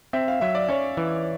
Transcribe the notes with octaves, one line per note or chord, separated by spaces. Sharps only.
C4 E5
F5
F#3 E5
D5
C#4 C#5
E3